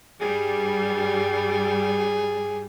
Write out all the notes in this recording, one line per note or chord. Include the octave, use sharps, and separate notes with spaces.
G2 G3 G#4